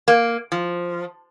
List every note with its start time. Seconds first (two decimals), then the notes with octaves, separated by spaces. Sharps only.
0.08 A#3
0.52 F3